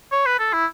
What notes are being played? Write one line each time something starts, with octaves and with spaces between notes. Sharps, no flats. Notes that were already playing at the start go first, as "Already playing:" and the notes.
C#5
B4
A4
E4